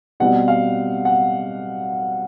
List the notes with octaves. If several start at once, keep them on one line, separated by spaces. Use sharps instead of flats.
B2 G3 C4 F#5
F5
F#5